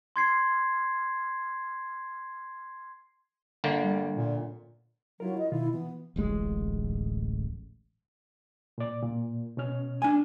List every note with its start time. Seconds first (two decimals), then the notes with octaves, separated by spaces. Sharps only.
0.16 C6 G#6 C7
3.64 G1 D3 A#3
3.83 G3
4.17 A#2
5.20 F#3 E4 F4 A#4
5.38 D#5
5.52 B2 D#3 E4 F4
5.74 E3 B3
6.16 D1 A1 G#3
8.78 A#2 D5
9.03 A#2
9.57 B2 C#4 F6
10.02 D4 G#5